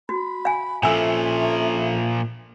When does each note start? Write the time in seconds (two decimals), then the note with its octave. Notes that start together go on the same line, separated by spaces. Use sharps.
0.09 F#4 B5
0.45 F5 G#5
0.83 A#2 F3 C#4 A4 E5 G#5 E6